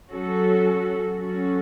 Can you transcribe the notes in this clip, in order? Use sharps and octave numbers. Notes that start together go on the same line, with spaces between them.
F#3 C#4 F#4 A4
F#3 C#4 F#4 A4